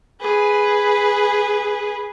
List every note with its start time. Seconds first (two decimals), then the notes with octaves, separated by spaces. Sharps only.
0.21 G#4 B4